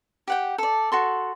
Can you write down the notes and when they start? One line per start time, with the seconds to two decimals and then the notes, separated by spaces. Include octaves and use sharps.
0.28 G4 F#5 G5
0.58 A4 D5
0.92 F#4 A4 C6